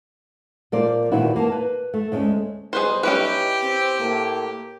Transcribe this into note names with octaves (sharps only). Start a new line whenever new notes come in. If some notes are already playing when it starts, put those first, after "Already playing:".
A#2 F3 A#3 C5 D5
A#2 D#3 E3 C4 E4 F#4
A#3 B3 E4 A5
B4
A3
D2 G#3 A3 C#4
B1 G3 D#4 G#4 B4 C5
C#4 E4 G4 B4
C4
A2 A#3